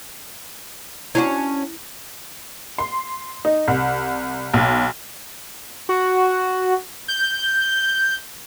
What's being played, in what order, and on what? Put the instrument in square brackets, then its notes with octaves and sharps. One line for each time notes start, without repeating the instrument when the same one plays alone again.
[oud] C#4 D4 F#4 [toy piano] E4
[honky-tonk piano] C6
D#4
C2
B1
[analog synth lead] F#4
G6